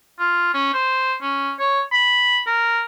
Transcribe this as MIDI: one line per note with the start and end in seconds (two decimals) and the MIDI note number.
0.19 0.49 65
0.54 0.72 61
0.74 1.15 72
1.22 1.53 61
1.59 1.82 73
1.92 2.41 83
2.47 2.82 70